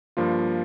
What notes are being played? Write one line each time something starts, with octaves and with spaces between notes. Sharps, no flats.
G2 F3 A#3 F4